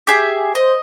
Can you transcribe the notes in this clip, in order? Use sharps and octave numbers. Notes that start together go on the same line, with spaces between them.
G4 G#4 E5
C5 D#5